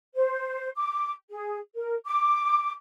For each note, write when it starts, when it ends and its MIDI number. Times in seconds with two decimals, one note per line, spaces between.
0.15 0.68 72
0.76 1.11 86
1.30 1.57 68
1.74 1.94 70
2.05 2.71 86